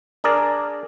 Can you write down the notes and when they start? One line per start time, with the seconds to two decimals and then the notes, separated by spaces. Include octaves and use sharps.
0.24 D4 G#4 A#4 D5